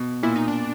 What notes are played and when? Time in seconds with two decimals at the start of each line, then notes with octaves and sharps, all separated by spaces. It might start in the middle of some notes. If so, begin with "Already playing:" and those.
Already playing: B2
0.23 A#2 E4
0.36 D#4
0.48 D4